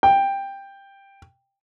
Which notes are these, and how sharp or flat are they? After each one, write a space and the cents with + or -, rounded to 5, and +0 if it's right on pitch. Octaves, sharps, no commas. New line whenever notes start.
G5 +10